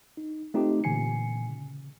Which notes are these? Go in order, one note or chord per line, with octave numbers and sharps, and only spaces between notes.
D#4
A3 C4 D#4 F4 G4
A#2 D3 E3 G#5 C7 C#7
C#3